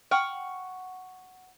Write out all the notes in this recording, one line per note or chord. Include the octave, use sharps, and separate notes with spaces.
F#5 G5 C#6 F6